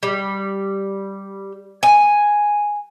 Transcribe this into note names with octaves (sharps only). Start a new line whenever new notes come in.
G3
G#5